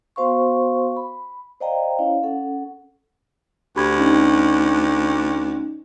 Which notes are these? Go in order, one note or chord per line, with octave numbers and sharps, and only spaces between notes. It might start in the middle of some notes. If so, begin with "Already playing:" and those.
B3 F#4 C5 F5 C6 C#6
B5
C5 D5 D#5 F5 G5 A#5
C#4 E4 C#5 F5
C#4 A4 F#5
D2 G4 B5 G#6
C#4 D#4